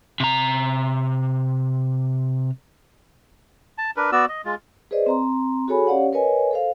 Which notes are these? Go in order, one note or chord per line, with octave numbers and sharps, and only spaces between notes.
C3 A#5
A5
D4 A#4 B4
B3 F#4 D5 E6
D#5
G#3 F4
G#4 B4 C5 D5 D#5
C4 A#5 C6
F#4 G#4 A4 C#5 G#5 B5
C#4 G4 C#5 D5 F5 F#5
A#4 B4 C#5 D#5 G#5
A4 C5 F5